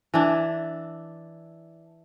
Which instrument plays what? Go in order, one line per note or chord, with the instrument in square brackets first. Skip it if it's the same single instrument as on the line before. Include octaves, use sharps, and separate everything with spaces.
[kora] E3 D4